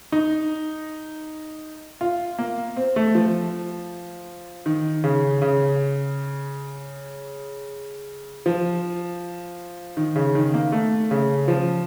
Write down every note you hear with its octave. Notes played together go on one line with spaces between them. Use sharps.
D#4
F4
A#3
C4
A3
F3
D#3
C#3
C#3
F3
D#3
C#3
D#3
A#3
A3
C#3
F3